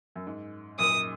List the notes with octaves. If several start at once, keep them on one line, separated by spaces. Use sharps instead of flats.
F#2
G#2
F#2 A#2 D#6